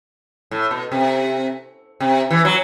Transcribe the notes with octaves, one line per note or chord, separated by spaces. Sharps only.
A2
B2
C3
C3
E3
F#3